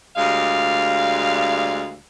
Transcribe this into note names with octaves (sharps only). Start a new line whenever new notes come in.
D2 G3 G#3 F5